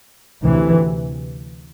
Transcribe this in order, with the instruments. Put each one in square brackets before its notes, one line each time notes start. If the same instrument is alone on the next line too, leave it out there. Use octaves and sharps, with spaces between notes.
[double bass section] D2 C3 E3